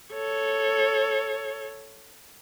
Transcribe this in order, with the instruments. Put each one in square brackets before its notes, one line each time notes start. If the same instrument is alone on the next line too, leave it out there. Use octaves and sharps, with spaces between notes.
[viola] A4 C#5